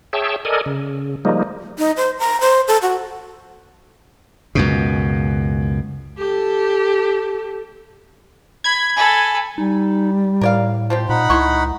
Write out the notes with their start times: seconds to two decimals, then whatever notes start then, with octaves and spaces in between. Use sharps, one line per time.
0.13 G#4 C#5 E5 G5 A5
0.45 A4 A#4 D5 D#5 G#5
0.66 C#3
1.25 F3 G3 G#3 A#3 D#4
1.78 D#4
1.97 C5
2.19 A#5
2.41 C5
2.68 A4
2.82 F#4
4.55 C#2 F#2 B2
6.18 G4 A4
8.64 B5 G#6
8.96 A4 G#5 B5
9.58 G3 D#4
10.41 A2 A#4 D5 F5
10.90 F3 C4 G4
11.09 A#2 D#4 F#5 B5
11.30 C#2 E4 C6 C#6